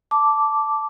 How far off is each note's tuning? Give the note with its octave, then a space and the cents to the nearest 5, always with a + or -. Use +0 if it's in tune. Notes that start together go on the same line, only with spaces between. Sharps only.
A5 +0 D6 -5